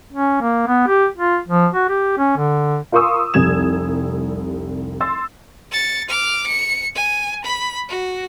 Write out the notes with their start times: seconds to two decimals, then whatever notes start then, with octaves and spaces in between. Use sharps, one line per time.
0.13 C#4
0.41 A#3
0.67 B3
0.87 G4
1.17 F4
1.48 F3
1.73 F#4
1.89 G4
2.18 C#4
2.37 D3
2.92 F4 A#4 C6 C#6 D#6 E6
3.34 F1 C2 G3 G#6 E7
5.01 C6 E6 A6
5.72 A6 C#7
6.09 D6 F6
6.47 C#7
6.95 G#5
7.44 B5
7.89 F#4